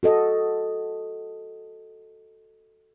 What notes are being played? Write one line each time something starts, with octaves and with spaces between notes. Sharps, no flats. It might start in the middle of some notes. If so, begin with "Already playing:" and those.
F#4 A4 D#5